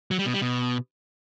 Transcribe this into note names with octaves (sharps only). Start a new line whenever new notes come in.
F#3
G3
B2
G3
B2